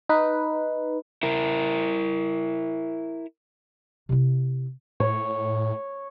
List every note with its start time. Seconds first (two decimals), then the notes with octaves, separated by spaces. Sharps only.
0.09 D#4 B4
1.23 E4 A#4
4.09 C3 E4
5.00 A2 C#5